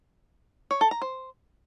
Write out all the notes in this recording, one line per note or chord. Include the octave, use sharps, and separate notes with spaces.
C#5
A4
A#5
C5